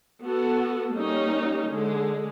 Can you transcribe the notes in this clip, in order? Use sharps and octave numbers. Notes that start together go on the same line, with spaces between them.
B3 F#4 A4
G3 A#3 C#4 D#4
D3 G#3